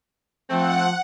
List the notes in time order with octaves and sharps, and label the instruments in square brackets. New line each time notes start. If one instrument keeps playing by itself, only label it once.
[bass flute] F3 [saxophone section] A3 C4 [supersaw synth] F#5